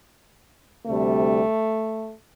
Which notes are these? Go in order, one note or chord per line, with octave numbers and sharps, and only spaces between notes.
D2 C3 G3 A3